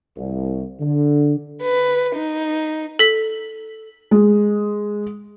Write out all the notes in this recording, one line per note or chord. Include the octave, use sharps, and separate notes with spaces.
C2
D3
B4
D#4
A4 B6
G#3